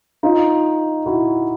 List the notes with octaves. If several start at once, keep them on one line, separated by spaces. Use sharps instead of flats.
D#4 F4
E4 F#4